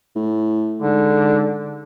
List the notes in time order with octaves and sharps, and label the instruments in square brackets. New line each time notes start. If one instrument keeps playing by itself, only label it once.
[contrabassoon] A2
[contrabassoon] G#2 [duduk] D3